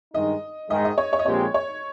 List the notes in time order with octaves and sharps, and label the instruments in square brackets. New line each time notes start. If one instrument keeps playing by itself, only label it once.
[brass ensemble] G2 D#3 G#3 D#4 [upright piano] D#5
[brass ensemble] G#2 D#3 G#3 [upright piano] D#5
[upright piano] D#5
C#5
C#5
D#5
[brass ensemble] A#1 A#2 G#3 C4 G4 [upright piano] C#5
[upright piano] C#5